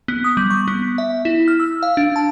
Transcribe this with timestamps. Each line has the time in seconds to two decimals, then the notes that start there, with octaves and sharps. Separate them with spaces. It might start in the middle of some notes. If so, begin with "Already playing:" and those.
0.08 B3
0.24 D#6
0.37 G3
0.50 C#6
0.68 B3
0.98 E5
1.25 E4
1.48 F6
1.60 E6
1.83 F5
1.97 D4
2.16 A5